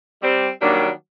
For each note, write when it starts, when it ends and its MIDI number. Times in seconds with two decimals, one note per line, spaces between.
0.23 0.49 55
0.23 0.49 60
0.62 0.90 51
0.62 0.90 54
0.62 0.90 55
0.62 0.90 58
0.62 0.90 62